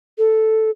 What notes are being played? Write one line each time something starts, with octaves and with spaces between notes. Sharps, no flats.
A4